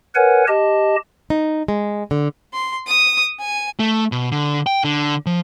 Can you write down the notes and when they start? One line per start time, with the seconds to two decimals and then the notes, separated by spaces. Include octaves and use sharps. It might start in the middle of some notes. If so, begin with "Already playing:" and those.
0.15 A#4 B4 C#5 F#5 G#5
0.47 G4 D#5 A5
1.30 D#4
1.68 G#3
2.11 D3
2.53 C6
2.87 D#6
3.39 G#5
3.80 A3
4.12 B2
4.32 D3
4.67 G5
4.84 D3
5.26 F3